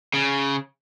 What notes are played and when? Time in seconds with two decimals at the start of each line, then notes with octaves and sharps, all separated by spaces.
0.14 C#3